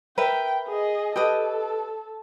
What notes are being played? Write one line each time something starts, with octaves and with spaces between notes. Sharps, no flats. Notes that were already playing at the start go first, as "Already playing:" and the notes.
A#4 B4 E5 G5
G#4 D#5
G4 A4 B4 D#5